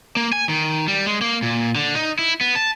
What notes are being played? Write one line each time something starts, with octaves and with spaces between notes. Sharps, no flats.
A#3
G#5
D#3
G3
G#3
A#3
A#2
D3
D#4
E4
B3
A5